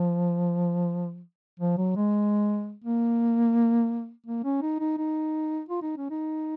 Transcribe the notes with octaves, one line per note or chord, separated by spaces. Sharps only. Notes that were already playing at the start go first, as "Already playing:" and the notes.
Already playing: F3
F3
F#3
G#3
A#3
A#3
C#4
D#4
D#4
D#4
F4
D#4
C#4
D#4